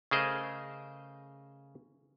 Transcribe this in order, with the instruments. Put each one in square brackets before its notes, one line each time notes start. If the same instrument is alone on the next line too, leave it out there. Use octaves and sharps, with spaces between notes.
[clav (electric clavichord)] C#3 A3 G#4 A#4 C5 D#5